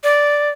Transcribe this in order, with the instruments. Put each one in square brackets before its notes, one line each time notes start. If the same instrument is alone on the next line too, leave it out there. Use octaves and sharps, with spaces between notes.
[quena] D5